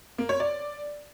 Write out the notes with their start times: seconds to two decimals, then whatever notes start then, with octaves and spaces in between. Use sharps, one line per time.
0.18 A#3
0.29 C#5
0.40 D5